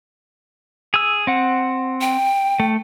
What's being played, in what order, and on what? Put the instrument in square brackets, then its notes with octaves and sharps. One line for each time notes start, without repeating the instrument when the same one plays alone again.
[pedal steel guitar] G#4 E6
C4 F#5
[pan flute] G5
[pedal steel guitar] A3